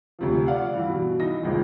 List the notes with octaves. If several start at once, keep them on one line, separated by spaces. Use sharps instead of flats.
D2 C3 F3
F4 D5 F5 F#5
G2 E3
B2
E3 D#4 A#6
G#1 C#2 A#2